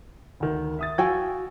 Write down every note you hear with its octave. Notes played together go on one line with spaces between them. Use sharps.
D2 D#3
E5 D#6 A6
F#4 F5 G5 G#5 E6 G#6